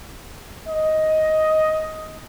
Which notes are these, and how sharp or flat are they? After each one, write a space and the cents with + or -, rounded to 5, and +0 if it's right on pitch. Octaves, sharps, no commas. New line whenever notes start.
D#5 +10